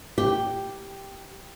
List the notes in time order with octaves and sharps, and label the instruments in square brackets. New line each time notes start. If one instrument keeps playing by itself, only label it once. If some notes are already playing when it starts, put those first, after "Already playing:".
[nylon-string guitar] G4